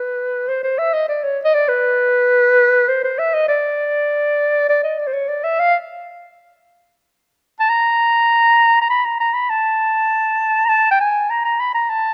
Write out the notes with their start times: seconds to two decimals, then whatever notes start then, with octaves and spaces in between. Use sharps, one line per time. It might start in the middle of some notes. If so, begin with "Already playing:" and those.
Already playing: B4
0.48 C5
0.63 C5
0.79 E5
0.94 D#5
1.09 D5
1.24 C#5
1.44 D#5
1.54 D5
1.69 B4
2.88 C5
3.04 C5
3.19 E5
3.34 D#5
3.48 D5
4.69 D5
4.84 D#5
4.99 D5
5.07 C5
5.13 C#5
5.29 D5
5.44 E5
5.60 F5
7.60 A5
7.69 A#5
8.82 A#5
8.90 B5
9.05 A#5
9.20 A#5
9.34 B5
9.50 A5
10.65 A#5
10.69 A5
10.91 G5
11.00 G#5
11.30 A#5
11.45 A#5
11.60 B5
11.75 A#5
11.90 A5